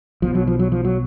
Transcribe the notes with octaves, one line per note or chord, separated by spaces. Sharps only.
B1 B2 F3
F#3
F3
F#3
F3
F#3